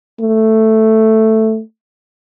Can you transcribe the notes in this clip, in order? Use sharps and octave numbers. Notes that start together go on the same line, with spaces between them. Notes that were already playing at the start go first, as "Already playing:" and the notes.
A3